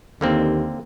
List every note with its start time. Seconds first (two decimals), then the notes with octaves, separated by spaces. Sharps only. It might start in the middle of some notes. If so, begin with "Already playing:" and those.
0.21 D#2 D3 A#3 C4